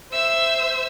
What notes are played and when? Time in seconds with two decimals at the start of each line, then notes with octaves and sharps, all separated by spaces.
0.11 C5 E5 E6